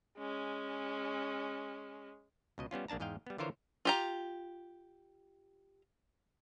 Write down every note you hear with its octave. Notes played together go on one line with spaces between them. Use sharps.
G#3 C#4
C#2 B2 D#5
G3 B3 C#4 F4
A#1 A#3 D4 A5 A#5
E2 G#2 D#5 F5 G5
G3 B3
D3 E3 F4 A#4 C5 C#5
F4 G4 A#5